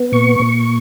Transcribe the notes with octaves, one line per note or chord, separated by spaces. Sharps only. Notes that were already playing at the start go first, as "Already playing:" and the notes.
Already playing: B3
A#2 C#6
A#2